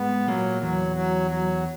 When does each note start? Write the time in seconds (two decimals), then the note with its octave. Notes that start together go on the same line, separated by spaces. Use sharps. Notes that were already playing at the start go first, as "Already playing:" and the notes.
Already playing: G#2 G#3 B3
0.27 A#2 F#3 A#3
0.62 E2 E3 F#3
0.96 F#3
1.31 F#3